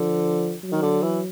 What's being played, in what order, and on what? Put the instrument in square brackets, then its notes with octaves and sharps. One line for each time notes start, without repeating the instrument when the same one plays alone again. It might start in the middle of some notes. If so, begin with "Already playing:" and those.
Already playing: [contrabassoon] D3 [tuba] F3
[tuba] F#3
[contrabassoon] D#3
D3
E3